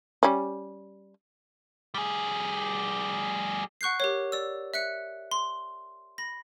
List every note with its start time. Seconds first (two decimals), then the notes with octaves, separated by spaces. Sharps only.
0.23 G3 C#4
1.94 G3 G#4
3.81 F#5 C#6 F#6 G6 C7
4.00 G4 A#4 C#5
4.32 D5 E6
4.74 E5 F#6 C#7
5.31 C6
6.18 B5 A#6